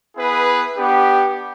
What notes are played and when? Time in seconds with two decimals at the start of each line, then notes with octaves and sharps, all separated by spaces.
0.16 B3 E4 G#4 B4
0.77 B3 D4 G4